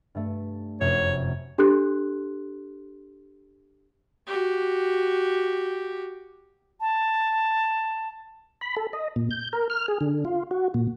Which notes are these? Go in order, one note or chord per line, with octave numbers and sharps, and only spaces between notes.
G2 A3
F1 F#2 C#5 C7
D4 G4 A4 C6 F#6
F#4 G4
A5
B5
A4
D#5
A#2
G6
A#4
F6
G#4
D3
F4
F#4
A#2